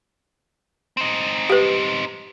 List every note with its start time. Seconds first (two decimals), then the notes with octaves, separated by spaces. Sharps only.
0.97 C4 D#4
1.50 G4 B4